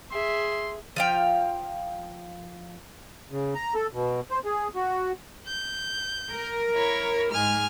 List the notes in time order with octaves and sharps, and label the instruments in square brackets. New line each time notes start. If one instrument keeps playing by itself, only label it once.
[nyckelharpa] G#4 [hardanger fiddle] E5 [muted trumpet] C6
[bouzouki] F3 F5 G5
[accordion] C#3
A#5
A4
B2
C5
G#4
F#4
[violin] G6
[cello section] A#4
[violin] E4 C#5
[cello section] G#2 G#3 [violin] G#5 F6